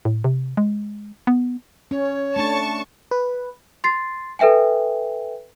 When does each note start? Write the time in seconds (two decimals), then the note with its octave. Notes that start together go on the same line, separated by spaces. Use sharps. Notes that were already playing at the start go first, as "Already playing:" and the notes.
0.05 A2
0.24 C3
0.57 G#3
1.27 B3
1.91 C#4 C#5
2.36 A3 D4 A5 C#6
3.11 B4
3.84 C6 A6 C7
4.39 A4 B4 E5 G5 G#5